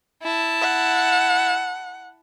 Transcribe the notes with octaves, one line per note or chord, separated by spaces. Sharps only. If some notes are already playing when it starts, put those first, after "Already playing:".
E4 A5
F#5